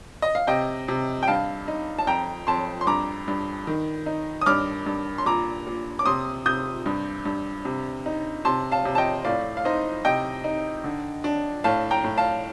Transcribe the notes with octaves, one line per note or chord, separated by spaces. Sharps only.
D#5
F5
C3 D#5 G5
C3
G5
G2 F5 A5
D#4
A5
F2 G5 A#5
F2 A5 C6
C6
G2 A#5 D6
G2
D#3
D#4
D#6
G2 D6 F6
G2
C6
A#2 A#5 D6
A#2
D6
C3 C6 D#6
C3 D#6 G6
G2
G2
C3
D#4
C3 A5 C6
F5 A5
C3
A5
D#5 G5
A2 D5 F5
F5
D#4 C5 D#5
C3 D#5 G5
D#4
D3
D4
A2 F5 A5
G5 A#5
A2
F5 A5